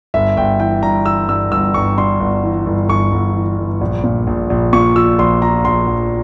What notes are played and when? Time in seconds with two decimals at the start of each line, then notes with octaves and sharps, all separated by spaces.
0.14 G1 E5
0.37 G1 G5
0.60 E3 G5
0.83 G2 A#5
1.06 E3 E6
1.29 G2 E6
1.52 G1 E6
1.74 G1 C#6
1.98 G2 C6
2.20 G1
2.43 E3
2.66 G1
2.89 G1 C#6
3.12 G1
3.35 E3
3.58 G1
3.81 A#1
4.04 A#2
4.27 A#1
4.50 A#1
4.73 A#2 C#6
4.96 F3 E6
5.19 A#1 C6
5.42 F3 A#5
5.65 A#1 C6
5.87 A#1